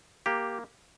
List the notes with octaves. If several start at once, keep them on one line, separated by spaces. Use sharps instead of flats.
A#3 G4